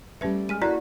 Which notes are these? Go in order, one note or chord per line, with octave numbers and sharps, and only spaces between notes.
G3 A3 C#4 B4 E5
G#3 F6 B6 D#7
A#3 E4 F#4 A4 D5 A#5 B6